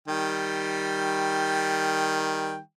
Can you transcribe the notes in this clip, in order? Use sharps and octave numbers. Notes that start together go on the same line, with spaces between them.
D#3 G3 G5